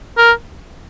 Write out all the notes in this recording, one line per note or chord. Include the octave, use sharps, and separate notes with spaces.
A#4